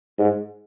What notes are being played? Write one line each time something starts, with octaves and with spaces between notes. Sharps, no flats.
G#2